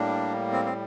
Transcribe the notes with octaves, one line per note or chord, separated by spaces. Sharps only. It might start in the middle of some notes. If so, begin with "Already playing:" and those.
Already playing: A2 G3 A#3 D4
C4
C4